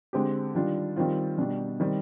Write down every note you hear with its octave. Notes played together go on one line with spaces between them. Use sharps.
D3 G#3 C4 G4
D#3 G3 D4 F4
D#3 G3 C4 F4
B2 G3 D4
D#3 G3 C4